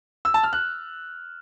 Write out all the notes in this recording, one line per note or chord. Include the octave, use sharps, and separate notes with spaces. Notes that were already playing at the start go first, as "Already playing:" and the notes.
E6
A5
F6
F#6